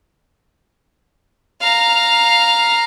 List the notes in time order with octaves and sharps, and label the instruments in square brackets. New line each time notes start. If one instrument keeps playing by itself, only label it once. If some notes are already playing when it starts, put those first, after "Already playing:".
[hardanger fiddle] F5 A#5